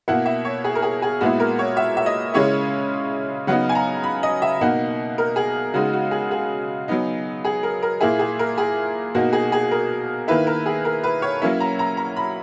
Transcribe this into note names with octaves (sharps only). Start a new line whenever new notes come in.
B2 A#3 E4 F#5
E5
C#5
G#4
A#4
G#4
G#4
A#2 G#3 B3 E4 F#4
A#4
C#5
E5
E5
D#5
C#3 G#3 C#4 E4 C#5
C#3 F#3 B3 D#4 F#5
G#5
A#5
B5
D#5
E5
B2 A#3 D#4 F#5
A#4
G#4
C#3 G#3 D#4 F#4
F#4
G#4
G#4
F#3 B3 D#4
G#4
A#4
A#4
A#2 A#3 E4 G#4
G#4
A#4
G#4
B2 A#3 D#4 F#4
G#4
G#4
A#4
D#3 A#3 E4 B4
A#4
G#4
A#4
B4
C#5
F#3 A#3 C#4 E4
A#5
A#5
A#5
B5